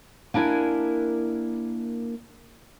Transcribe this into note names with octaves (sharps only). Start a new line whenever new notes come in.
A#3 D4 E4 A#4 G#5